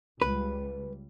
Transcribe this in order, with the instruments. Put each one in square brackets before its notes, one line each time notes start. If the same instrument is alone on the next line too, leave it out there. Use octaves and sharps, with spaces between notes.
[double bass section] C#2 G3 [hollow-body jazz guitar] B4